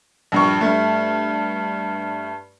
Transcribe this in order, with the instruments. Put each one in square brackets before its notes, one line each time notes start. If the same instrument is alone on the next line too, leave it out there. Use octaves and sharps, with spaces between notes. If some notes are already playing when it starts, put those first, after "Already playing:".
[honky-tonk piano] A#1 G2 C#6
G2 A3